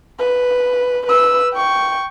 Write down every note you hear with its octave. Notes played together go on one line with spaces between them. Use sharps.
B4
B4 E6
G5 C#6